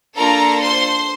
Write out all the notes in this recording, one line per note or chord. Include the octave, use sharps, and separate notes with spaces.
A#3 D4 F4 A4 A#4 A#5
C5 C6